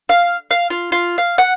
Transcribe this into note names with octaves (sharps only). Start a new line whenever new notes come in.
F5
F5
F4
F4
F5
F#5